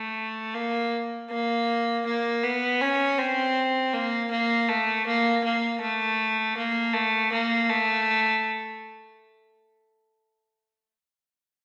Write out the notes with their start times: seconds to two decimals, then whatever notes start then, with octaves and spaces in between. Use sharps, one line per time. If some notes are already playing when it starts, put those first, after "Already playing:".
Already playing: A3
0.55 A#3
1.30 A#3
2.06 A#3
2.43 B3
2.81 C#4
3.18 C4
3.93 A#3
4.31 A#3
4.69 A3
5.07 A#3
5.44 A#3
5.81 A3
6.57 A#3
6.93 A3
7.32 A#3
7.69 A3